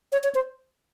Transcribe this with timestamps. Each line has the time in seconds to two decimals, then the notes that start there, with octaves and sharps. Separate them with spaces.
0.12 C#5
0.24 C#5
0.35 C5